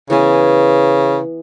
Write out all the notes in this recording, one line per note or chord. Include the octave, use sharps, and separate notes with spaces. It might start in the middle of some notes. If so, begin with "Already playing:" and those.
C#3 E3 B3 G#5